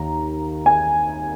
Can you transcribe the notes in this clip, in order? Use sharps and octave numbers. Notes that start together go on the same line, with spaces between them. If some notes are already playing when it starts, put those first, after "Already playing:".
Already playing: D#2 D#3 A#5
G#5